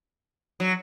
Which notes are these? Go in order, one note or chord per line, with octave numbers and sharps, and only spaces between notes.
F#3